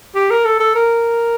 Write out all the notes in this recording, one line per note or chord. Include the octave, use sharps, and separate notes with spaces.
G4
A#4
A4
A4
A#4